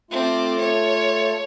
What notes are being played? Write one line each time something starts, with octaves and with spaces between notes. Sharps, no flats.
A3 C4 F4 D6
C#5